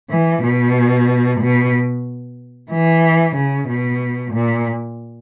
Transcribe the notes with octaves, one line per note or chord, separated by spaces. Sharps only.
E3
B2
B2
E3
C#3
B2
A#2